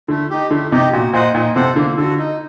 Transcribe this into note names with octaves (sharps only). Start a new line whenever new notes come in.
D3 A3
D#4 G4
D3 A3
C3 D#4 G4
A#2 F#4
A#2 C5 D#5 F#5
A#2 D#4
C3 A4 C5 F#5
D3 A#3
D3 F#4 A4
D#4